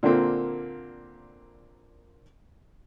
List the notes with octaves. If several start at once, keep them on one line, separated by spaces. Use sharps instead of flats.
A#2 D3 A#3 C4